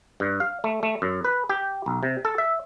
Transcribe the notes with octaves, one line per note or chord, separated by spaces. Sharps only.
G2
F5
A3
A3
F#2
B4
G4
B1
C3
A4
E5